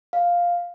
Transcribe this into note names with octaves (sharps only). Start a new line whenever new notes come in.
F5